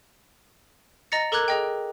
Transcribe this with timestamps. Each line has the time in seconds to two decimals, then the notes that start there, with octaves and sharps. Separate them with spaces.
1.12 D#5 A#5 A6 A#6 C#7
1.32 A4 A#4 A#5 D6 F#6 G#6
1.48 G#4 D#5 G5